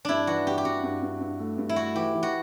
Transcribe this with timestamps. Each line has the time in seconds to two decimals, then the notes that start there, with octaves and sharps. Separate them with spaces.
0.05 G2 D4 E4
0.27 E3 F#4
0.46 G2 G4
0.58 G4
0.65 G2 F#4
0.83 G2
1.02 G2
1.21 G2
1.39 A3
1.58 G2
1.69 E4
1.76 A3 F#4
1.95 E3 G4
2.14 E3
2.23 F#4